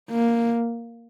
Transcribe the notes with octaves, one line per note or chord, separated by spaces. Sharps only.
A#3